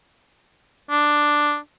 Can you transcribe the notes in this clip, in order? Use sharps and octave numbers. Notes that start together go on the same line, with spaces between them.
D4